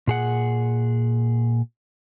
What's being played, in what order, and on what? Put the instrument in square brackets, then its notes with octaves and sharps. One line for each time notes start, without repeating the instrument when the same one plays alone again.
[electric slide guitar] A#2 G#4 F#5